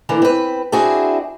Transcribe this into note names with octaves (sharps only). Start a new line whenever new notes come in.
D3 E3 A#3
C4 B4
C4 D4 E4 F#4 G#4